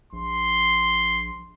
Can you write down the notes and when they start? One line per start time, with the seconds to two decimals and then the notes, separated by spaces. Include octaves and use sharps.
0.13 A#1 C6